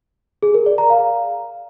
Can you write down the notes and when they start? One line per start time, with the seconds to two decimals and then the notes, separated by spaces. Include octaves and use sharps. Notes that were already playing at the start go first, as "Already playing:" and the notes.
0.43 G#4
0.54 A#4
0.66 D5
0.78 A#5
0.90 F5